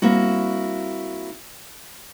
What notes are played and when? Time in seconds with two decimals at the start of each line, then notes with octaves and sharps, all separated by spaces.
0.02 G3 A#3 C4 E4 F#4